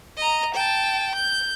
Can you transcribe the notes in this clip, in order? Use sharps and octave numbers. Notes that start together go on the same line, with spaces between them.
D#5 A#5
G5 A5
G6